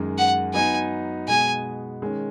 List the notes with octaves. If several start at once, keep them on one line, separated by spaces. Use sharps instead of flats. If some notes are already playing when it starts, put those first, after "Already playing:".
Already playing: F#2 D#3 G#3
F#5
F#3 B3 D#4 G#5
B2 G#3 B3 G#4 G#5
D#3 G#3 C#4